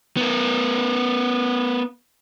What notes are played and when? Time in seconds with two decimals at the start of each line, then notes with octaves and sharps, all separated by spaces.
0.17 B3 A#4